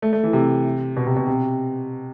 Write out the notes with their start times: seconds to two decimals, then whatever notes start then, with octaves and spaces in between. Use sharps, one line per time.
0.02 A3
0.13 A3
0.24 E3
0.33 C3
0.97 B2
1.06 C3
1.16 B2
1.27 C3